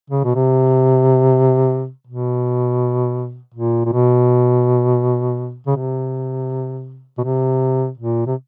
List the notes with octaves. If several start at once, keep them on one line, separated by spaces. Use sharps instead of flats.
C#3
B2
C3
B2
A#2
A#2
B2
C#3
C3
B2
C3
A#2
C3